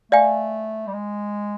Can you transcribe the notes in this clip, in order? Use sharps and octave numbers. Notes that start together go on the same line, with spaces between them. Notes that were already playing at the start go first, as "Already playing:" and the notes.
A3 D5 F5 G#5
G3
G#3